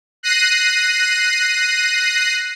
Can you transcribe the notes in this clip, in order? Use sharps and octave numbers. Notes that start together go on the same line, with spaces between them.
F#6 A#6 C7 D#7